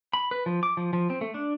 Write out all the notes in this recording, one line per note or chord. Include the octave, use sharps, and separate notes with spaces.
B5
B4
F3
D6
F3
F3
C4
A3
D4